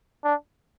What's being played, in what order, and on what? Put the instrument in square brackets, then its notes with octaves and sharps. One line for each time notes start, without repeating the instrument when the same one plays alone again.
[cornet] D4